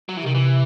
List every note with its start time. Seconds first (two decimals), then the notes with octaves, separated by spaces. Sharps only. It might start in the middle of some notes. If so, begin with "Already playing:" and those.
0.09 F#3
0.17 E3
0.24 C3 D#3
0.35 E3